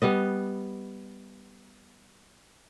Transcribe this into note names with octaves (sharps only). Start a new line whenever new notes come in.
G3 B3 D#5